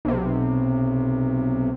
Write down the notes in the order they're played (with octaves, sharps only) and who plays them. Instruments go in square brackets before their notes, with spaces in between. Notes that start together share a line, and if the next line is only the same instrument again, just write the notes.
[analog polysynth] B1 C3